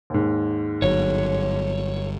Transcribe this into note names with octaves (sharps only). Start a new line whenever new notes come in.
D#2 G#2
G1 F#3 C#5